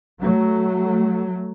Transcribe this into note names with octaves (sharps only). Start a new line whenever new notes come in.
F#3 A3